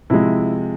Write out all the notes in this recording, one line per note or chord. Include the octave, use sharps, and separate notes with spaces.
C3 F3 G#3 E4